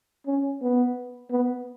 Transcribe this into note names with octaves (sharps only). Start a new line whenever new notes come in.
C#4
B3
B3